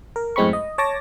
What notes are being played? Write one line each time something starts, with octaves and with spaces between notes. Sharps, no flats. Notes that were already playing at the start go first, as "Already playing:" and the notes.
A#4
F#2 A2 G#3 C4 B5 C#6
D#5
C#5 A5 D6 A#6